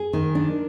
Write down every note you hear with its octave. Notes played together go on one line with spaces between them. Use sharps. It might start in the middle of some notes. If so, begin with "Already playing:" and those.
Already playing: G#4
D#3
D4